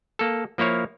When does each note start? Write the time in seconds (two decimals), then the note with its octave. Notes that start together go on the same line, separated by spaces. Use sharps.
0.19 A#3 A4
0.58 F3 A#3 E4 C#5 F5